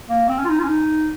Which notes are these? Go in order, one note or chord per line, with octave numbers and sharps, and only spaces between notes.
A#3
C4
C#4
F4
D#4
F4
C#4
D#4